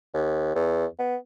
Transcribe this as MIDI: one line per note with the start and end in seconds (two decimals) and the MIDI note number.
0.14 0.55 39
0.55 0.86 40
0.99 1.16 59